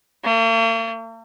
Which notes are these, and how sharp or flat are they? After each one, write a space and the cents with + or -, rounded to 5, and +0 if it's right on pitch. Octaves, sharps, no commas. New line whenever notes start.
A#3 -45